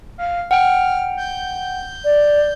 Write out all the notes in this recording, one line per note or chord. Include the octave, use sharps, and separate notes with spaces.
F5
F#5 G5 F6
G6
D5